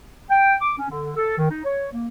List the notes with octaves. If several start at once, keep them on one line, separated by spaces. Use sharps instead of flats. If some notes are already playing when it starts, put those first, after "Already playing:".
G5
D6
C#4
D3
A4
D#3
D#4
C#5
A#3